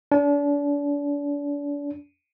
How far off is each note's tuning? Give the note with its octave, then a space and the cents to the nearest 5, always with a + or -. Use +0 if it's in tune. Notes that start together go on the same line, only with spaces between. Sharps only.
D4 -35